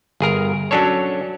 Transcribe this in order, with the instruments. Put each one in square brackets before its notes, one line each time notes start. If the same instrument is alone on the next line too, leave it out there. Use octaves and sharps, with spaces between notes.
[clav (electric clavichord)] G1 G#4 A#4 A#5
F#3 C#4 D4 A4 C#5